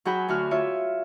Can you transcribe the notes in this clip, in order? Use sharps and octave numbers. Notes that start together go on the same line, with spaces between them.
F#3 F#4 G#4 F#5 G5 B5
D2 F#4 F6
F4 C#5 E5